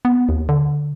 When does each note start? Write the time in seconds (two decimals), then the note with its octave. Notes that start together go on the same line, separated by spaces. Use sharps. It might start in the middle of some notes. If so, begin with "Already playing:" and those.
0.05 B3
0.29 D#2
0.49 D3